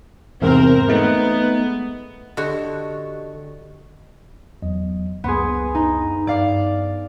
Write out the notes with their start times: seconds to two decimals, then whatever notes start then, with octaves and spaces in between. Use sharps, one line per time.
0.42 E2 G#2 C3 C4 A#4
0.88 G#3 A3 B3 D#4
2.37 D3 F#4 G4 D#5
4.62 E2 F#3 D#5
5.24 C#2 F#2 B3 G#4 C6
5.75 D#4
6.27 G2 D5 F5